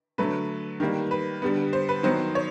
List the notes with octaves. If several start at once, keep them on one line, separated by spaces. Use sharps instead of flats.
D3 F#3 A3 B4
D#3 G3 A#3
B4
D3 G3 B3
C5
B4
D#3 F#3 B3 C5
C#5